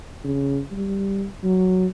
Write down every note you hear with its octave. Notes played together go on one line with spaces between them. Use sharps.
C#3
G3
F#3